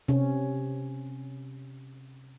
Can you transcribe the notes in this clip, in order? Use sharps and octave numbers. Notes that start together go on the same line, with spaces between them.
C3 C#4